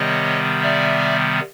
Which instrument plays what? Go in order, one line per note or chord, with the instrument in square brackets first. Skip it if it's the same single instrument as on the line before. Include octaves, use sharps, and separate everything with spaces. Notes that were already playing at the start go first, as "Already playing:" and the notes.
Already playing: [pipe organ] C3 D#3 G3 B3 C#5 D#5
D5 E5